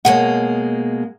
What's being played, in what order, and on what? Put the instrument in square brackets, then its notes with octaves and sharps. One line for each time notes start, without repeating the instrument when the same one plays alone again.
[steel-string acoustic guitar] B2 G#3 A#3 [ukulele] C#5 F#5